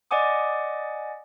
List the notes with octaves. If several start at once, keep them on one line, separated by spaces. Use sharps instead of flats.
D5 D#5 F#5 G#5 D6 D#6